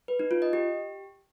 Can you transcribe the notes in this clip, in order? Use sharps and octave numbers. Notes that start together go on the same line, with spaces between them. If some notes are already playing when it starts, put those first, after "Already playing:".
B4
D#4
F4
D#5
G4